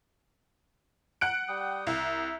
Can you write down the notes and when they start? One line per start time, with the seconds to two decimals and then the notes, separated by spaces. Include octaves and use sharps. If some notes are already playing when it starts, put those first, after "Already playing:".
1.21 F#5 F#6 D7
1.48 G3 G5 D#6
1.87 C2 E5